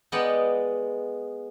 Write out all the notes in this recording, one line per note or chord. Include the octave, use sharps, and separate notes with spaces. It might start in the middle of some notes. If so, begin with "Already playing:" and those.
G#3 B3 D5 D#5 F#5 G5